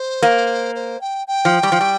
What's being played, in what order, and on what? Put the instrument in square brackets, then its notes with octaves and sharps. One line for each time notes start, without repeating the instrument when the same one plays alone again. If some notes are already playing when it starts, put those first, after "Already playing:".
Already playing: [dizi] C5
[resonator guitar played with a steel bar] A#3
[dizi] C5
G5
G5
[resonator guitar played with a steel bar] F3
G3
F3
G3